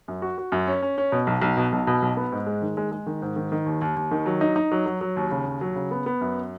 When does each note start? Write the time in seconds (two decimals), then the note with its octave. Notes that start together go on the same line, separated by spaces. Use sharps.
0.08 F#2
0.22 F#4
0.38 F#4
0.52 F#2
0.67 C#4
0.82 C#4
0.98 C#4
1.12 B2
1.27 B1
1.42 B1
1.57 B2
1.72 B1
1.87 B2
2.02 B1
2.17 B3
2.32 G#2
2.47 G#3
2.62 D#3
2.77 G#3
2.92 G#3
3.07 D#3
3.22 G#2
3.36 D#3
3.52 D#3
3.66 D#2
3.82 D#2
3.96 D#2
4.11 D#3
4.26 F#3
4.41 D#4
4.56 D#4
4.71 F#3
4.86 F#3
5.01 F#3
5.16 D#2
5.31 C#3
5.46 D#2
5.61 F#3
5.76 C#3
5.91 B3
6.06 B3
6.21 F#2